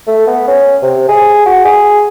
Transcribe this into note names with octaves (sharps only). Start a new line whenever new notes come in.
A3
B3
C#4
C3
G#4
F#4
G#4